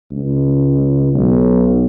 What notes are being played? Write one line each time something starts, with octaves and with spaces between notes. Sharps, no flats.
C#2
B1